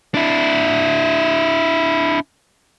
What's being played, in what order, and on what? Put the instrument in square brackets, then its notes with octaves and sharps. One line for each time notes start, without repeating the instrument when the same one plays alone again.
[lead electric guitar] D4 E4